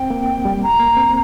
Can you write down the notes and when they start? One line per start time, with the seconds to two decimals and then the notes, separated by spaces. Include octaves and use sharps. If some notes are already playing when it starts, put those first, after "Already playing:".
Already playing: C4 G5
0.10 A#3
0.45 G3
0.63 A#5
0.80 A#3
0.97 C4